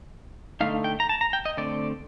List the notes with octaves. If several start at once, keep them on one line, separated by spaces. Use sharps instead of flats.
D3 A3 D#4 F5
G5
A#5
A5
A#5
G5
D#5
D3 A3 C4 D5